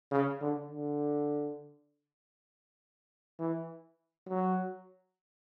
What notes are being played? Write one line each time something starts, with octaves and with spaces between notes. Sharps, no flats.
C#3
D3
D3
E3
F#3